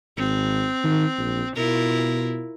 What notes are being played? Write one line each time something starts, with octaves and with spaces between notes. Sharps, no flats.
G#1 C4
D#3
A#1
B2 E4 F4 A#4